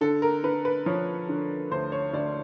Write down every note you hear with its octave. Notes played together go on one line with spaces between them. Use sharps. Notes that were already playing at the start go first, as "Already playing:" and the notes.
D3 A4
A#4
D3 B4
B4
F3 C#5
D3
D2 C5
C#5
D2 D5